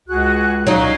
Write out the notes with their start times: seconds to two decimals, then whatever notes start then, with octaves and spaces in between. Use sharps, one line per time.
0.08 C#2 F#4 G#4 F#6
0.67 F#3 C#4 D#4 D#5 F5